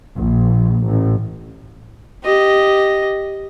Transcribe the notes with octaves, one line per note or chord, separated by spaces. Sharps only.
A#1
A1
G4 D#5